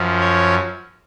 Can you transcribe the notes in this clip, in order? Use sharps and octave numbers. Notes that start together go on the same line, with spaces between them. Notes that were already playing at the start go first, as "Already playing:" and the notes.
Already playing: F#2 F3
C#5